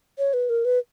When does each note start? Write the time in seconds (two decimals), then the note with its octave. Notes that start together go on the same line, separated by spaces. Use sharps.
0.18 C#5
0.34 B4
0.49 A#4
0.65 B4